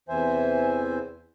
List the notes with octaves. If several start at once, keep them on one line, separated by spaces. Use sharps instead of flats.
E2 C3 E3 C5 E5 G#5